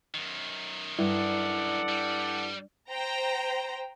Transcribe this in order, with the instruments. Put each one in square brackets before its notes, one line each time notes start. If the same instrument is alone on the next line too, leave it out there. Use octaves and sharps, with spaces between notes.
[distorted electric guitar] F#2 D#3
[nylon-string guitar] G2 [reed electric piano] E4 [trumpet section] A4 D5 F#5
[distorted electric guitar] G3
[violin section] C5 G5 A#5